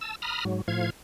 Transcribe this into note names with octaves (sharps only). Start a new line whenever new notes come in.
A5 E6
A#5 B5 D#6 F6
G#2 F#3
A2 F3 F5 G#6